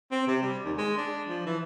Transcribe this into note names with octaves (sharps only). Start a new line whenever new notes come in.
C4
C3
G3
D#2
G#3
D4
F3
E3